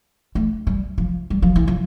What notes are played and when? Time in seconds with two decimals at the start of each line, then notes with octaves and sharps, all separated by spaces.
0.35 A3
0.67 G3
0.98 F3
1.30 G3
1.42 F3
1.56 E3
1.68 F3